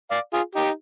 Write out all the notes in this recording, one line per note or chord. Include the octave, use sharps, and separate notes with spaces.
D5 F5
F4 G#4
D#4 G4